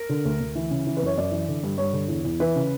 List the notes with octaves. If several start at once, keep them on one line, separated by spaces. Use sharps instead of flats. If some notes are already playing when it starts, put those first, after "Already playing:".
Already playing: A#4
D3
D2
D2
E3
C#3
E3
B4
F#2 C#5
F#2 D5
E3
D3
G2
G2 C#5
D3
E2
E2
E3 B4
C#3